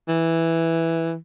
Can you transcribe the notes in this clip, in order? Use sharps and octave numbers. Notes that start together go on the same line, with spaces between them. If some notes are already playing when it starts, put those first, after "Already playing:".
E3